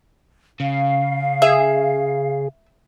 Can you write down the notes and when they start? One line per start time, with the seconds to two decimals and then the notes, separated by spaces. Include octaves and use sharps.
0.60 C#3 F5
1.42 G#4 E5